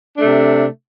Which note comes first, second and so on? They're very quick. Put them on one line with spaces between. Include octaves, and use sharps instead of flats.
D4 A3 C3